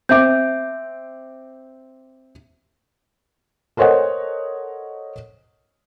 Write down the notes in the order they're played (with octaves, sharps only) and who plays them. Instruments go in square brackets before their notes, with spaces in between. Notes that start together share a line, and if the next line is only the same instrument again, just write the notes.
[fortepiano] C4 D6 [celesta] E5 G6
[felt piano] A4 A#4 C5 C#5 D#5 F#5